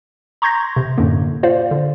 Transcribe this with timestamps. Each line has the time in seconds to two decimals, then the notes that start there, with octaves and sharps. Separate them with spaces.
0.42 A#5 C6 C#6 G6 G#6 A#6
0.76 C3
0.98 F#2 A2 D3 A#3
1.43 F4 C5 D5 F5
1.71 D3